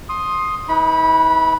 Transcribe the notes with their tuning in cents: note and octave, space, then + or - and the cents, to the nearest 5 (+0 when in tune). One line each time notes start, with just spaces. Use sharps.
C6 +15 D#6 +0
D#4 +45 B4 +0 B5 -20